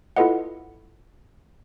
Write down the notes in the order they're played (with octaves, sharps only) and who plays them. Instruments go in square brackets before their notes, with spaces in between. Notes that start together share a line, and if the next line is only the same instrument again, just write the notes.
[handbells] E4 F4 A4 B4 D#5 F#5